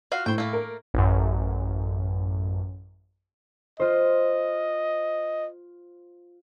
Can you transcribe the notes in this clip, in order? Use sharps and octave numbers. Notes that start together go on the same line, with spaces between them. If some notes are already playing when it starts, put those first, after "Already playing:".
F4 F#4 F5
A2 C5 G5
A3 A#3
A#4
A1 F#2
F4 C5 D#5